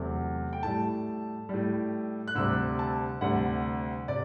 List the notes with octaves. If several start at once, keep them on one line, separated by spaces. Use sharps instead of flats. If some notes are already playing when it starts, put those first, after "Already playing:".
Already playing: E2 C3 F#3 A3
G5
A2 G3 A5
A2 G3
F#6
D2 C3 G3 E6
A5
D2 C3 G3 F#5
C3 D5